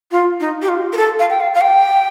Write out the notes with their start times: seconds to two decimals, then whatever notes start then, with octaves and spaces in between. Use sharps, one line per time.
0.12 F4
0.40 D#4
0.62 G4
0.69 F4
0.93 A#4
0.97 A4
1.19 F5
1.30 G5
1.40 F5
1.54 F5
1.61 G5